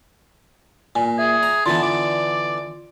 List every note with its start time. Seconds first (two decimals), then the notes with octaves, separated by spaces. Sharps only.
0.95 A#2 G#5
1.19 G#4 E5
1.43 A#5
1.66 D3 E3 B3 F4 A5 C6
1.83 D5